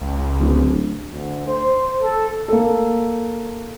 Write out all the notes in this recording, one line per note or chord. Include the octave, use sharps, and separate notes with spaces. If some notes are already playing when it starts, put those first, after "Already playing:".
C#2
D1
D2
C5
A4
A#3 A4